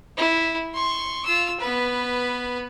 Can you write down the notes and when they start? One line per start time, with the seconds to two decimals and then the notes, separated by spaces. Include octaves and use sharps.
0.17 E4
0.74 C6 C#6
1.25 F4 E6
1.60 B3 B4